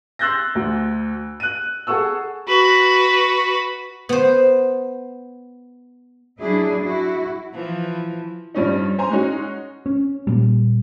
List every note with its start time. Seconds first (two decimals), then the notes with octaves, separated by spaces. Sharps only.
0.19 C6 E6 F#6 G6 A6 A#6
0.55 D2
1.40 F#6 D#7
1.87 G#4 A4 F#5 C#6 E6
2.48 F#4 B4
4.09 B3 C5
6.40 F#3 D4 E4 G#4
6.83 E4 F#4
7.54 E3 F3
8.54 G2 F3 G3 C#4 D#4
8.98 C5 G#5 A#5 C6
9.11 G#3 C#4 D#4 F#4
9.86 C#4
10.27 A#2 G3